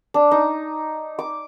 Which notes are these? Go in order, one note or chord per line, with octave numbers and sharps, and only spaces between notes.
D4
D#4
D6